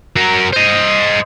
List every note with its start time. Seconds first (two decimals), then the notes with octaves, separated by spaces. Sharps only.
0.16 F#3 A#4
0.53 C5 D#5